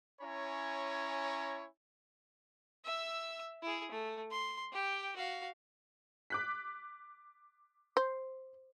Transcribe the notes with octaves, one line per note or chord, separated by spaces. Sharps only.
C#4 E4 C#5 G#5 A#5
E5 E6
E4 G#4
A3
C6
G4 G5
F#4 F5
D6 F#6 B6
C5